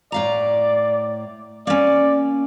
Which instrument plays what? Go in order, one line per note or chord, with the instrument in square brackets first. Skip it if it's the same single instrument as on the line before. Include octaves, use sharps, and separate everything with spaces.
[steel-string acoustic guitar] A2 F5 A#5 [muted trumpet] D5
[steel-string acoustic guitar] A#3 C#4 [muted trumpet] D5